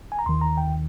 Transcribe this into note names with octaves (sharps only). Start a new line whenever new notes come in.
G#5
A#5
D#2 D#3 C6
A#5
G5